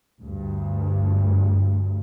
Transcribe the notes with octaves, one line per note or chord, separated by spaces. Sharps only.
D2 G2